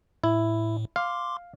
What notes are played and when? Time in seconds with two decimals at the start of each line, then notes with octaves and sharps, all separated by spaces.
0.24 A2 E4
0.96 F5 C6 D6